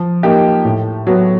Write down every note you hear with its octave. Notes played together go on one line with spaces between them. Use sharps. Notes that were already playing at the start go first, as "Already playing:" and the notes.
Already playing: F3
A#3 D#4 G4
A2
F#3 B3